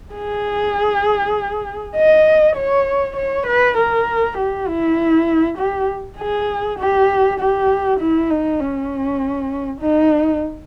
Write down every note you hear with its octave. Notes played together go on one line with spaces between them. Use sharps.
G#4
D#5
C#5
C#5
B4
A#4
G4
E4
G4
G#4
G4
G4
E4
D#4
C#4
D#4